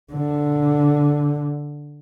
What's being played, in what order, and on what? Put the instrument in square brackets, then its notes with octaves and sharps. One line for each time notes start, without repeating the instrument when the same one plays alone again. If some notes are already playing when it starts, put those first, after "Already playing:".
[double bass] D3